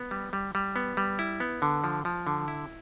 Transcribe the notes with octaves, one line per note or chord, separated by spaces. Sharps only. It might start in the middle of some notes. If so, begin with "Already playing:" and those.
Already playing: B3
G3
G3
G3
B3
G3
E4
B3
D3
F3
F3
D3
E4